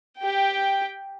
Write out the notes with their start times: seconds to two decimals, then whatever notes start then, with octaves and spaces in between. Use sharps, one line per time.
0.18 G4 G5